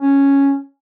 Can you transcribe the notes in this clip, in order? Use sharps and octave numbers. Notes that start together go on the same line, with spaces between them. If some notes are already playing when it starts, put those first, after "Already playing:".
C#4